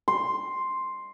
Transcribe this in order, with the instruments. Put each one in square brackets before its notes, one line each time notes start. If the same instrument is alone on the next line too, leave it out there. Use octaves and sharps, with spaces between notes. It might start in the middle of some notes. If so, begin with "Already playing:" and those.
[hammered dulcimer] C6